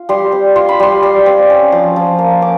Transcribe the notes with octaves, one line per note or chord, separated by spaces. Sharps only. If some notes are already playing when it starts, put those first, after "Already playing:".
Already playing: F4
G3 C6
C4
F4 C6
B5
G3 C6
G3
C4
C#4
F3
F3
A#3
C#4 D6